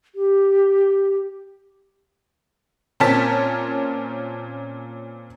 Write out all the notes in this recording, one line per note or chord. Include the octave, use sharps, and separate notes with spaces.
G4
A#2 C4 C#4 A#4 A5 B6